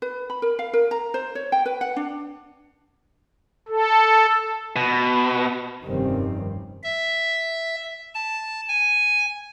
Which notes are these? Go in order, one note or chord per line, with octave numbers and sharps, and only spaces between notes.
B4
B5
A#4
F5
A#4
A#5
C5
C#5
G5
B4
F#5
D4
A4
B2
F1 G2 D#3 G3 C4 C#4
E5
A5
G#5